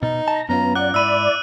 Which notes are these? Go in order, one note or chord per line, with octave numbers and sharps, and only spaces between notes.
B2 D#4
A5 A#5
F#2 B3 C#4 F4 A#5
D5 F#5 F#6
G#2 E4 B5 E6 D#7 F#7